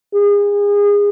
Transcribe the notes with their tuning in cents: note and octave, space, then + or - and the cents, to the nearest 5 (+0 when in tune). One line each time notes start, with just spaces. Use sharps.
G#4 -30